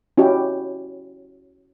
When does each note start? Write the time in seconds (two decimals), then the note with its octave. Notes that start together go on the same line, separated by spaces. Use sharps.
0.18 C#4 E4 F#4 G4 D#5